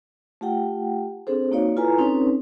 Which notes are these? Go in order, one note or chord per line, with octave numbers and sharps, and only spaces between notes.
A3 F4 G4 F#5 G5
C4 D4 G#4 A4 C5
A#3 D#4 F#4 C#5 D5 F5
E4 F4 A4 B4 G#5 A#5
C4 C#4 D#4 A4 B4 C#5